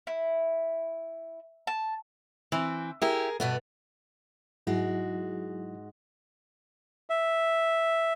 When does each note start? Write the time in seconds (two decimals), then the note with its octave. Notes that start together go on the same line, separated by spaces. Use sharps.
0.07 E4
1.67 A5
2.52 E3 C4
3.02 E4 G4 G#4 A#4
3.40 G2 B2 A3 B3
4.67 G#2 F#3 G#3 E4 F#4
7.10 E5